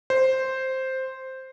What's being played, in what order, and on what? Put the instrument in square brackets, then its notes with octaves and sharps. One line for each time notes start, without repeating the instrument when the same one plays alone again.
[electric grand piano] C5